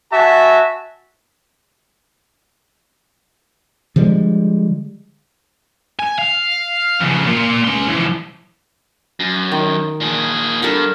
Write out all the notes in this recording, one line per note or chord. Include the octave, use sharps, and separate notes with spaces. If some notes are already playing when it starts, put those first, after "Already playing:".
F#4 E5 G#5 A5
D3 F3 G3 G#3
G#5
F5
F2 C#3
A#2 F4
C#4 C6
E3 F3
F#2
D#3
A#2 G#4
G2 A4 A#4 F#5